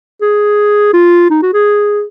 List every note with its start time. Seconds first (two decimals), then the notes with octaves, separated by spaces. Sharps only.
0.22 G#4
0.93 F4
1.30 D#4
1.43 F#4
1.53 G#4